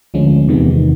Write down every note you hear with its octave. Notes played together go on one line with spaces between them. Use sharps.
D2 D3 F3 G#3 C#4
E2 C3 D#3 G#3 B3